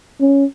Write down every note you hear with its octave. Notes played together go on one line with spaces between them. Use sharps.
C#4